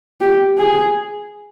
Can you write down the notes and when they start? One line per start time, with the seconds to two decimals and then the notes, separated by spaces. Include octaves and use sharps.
0.21 G4
0.58 G#4